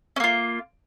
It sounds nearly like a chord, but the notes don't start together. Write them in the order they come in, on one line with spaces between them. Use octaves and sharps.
C#4 A#3 F4